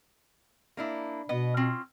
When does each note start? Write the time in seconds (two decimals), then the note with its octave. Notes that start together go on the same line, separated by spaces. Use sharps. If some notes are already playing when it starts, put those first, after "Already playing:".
0.77 A#3 D4 E4
1.29 B2 B3 D#5
1.57 C4 C#4 F4